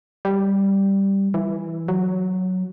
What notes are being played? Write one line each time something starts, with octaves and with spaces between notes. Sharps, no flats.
G3
E3
F#3